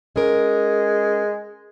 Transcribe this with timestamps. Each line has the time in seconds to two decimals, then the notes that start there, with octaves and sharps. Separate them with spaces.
0.16 G#3 C#4 A#4